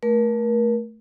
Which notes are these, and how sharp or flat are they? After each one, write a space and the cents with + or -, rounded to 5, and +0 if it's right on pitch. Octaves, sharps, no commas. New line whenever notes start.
A3 +0 A#4 +35